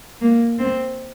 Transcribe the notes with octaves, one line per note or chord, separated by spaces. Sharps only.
A#3
C4